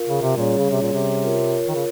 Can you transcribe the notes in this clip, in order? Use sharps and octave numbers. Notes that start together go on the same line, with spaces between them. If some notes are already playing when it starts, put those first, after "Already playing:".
Already playing: F4 A#4 F5
C#3
C3
A#2 G3 C#4 G#4 C#5
C#3
C3
A#2
C3
F4 A#4 C#5
D#3
C#3